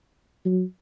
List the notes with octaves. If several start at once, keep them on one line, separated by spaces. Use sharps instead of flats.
F#3